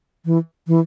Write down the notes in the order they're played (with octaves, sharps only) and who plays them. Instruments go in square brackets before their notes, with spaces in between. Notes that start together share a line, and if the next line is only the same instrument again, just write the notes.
[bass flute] E3
E3